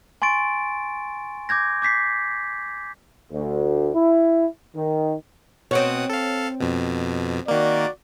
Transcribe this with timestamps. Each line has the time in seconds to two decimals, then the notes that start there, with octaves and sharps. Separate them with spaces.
0.22 G#5 C6 C#6 A6 D7
1.49 D6 G6 G#6 A#6
1.82 D6 G6 B6 C7
3.33 D2
3.94 E4
4.76 D#3
5.71 B2 C4 C#5 F#5 D#6
6.10 A4 F5
6.60 F2 B2
7.48 D#3 A#3 F#4 D5